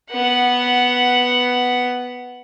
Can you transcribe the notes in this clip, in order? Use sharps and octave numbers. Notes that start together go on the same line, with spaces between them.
B3 F#5